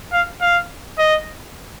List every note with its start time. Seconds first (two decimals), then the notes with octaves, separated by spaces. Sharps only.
0.13 F5
0.41 F5
0.99 D#5